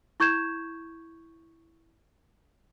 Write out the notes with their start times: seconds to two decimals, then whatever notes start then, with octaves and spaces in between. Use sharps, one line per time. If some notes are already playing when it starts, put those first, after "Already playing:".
0.20 E4 C#6 G6 G#6 E7